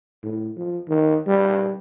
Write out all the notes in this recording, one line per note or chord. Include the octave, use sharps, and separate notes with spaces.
A2
F3
D#3
G3